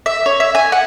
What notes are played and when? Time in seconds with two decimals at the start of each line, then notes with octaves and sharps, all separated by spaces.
0.06 E5
0.26 C#5
0.40 E5
0.55 G#5
0.72 F#5